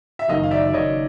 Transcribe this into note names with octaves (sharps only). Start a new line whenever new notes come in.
E5
F#1 F#2 D#3 D#5 F5
F5
D5 E5
D5
F#1 F#2 D#3 C#5 D#5